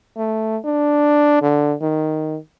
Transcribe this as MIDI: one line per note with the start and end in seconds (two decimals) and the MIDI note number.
0.17 0.57 57
0.64 1.41 62
1.42 1.73 50
1.81 2.36 51